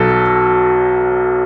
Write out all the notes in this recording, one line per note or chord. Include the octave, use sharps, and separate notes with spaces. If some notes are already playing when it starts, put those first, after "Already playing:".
Already playing: B1 B2 F#3 A4